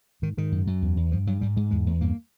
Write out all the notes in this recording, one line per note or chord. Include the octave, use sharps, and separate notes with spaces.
G#2 D#3
G#2 D#3
F#2
F#2
E2
E2
G2 F3
G2 F#3
G#2 G3
G#2 G#3
E2 G#3
E2 A3
G2 A#3